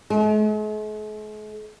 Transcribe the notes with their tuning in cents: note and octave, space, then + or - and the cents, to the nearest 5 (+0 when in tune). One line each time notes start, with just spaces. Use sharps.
G#3 +45